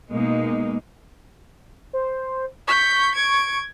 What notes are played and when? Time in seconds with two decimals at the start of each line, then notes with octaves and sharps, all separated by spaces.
0.11 B2 G#3 A#3 D#4
1.93 C5
2.67 C#6 G6 B6
3.15 G#6 D7